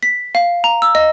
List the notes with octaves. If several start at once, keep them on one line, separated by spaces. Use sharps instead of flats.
B6
F5
A#5
E6
D#5